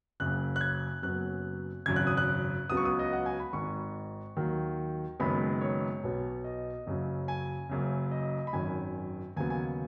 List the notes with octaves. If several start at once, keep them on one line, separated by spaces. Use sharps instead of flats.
F#1 F#2 C#3 F#6
F#6
G#6
F#1 F#2 F#3 B3 F#6
G#1 F#2 C#3 G#6
F#6
D#6
F#6
C#2 C#3 F#3 B3 D#6
C#6
D#6
D#5
F#5
G#5
B5
G#1 G#2 D#3 C#6
D#2 D#3 F#3
F#1 F#2 D#3 G#3 B3 B5
C#5
B1 B2 B3
D#5
F#1 F#2 C#3 F#3
G#5
F#1 F#2 C#3
D#5
B5
G#1 F#2 D#3 G#5
D#2 C#3 F#3 B3 G#5
G#5